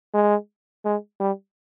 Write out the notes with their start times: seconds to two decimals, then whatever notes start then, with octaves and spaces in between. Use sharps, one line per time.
0.14 G#3
0.85 G#3
1.20 G3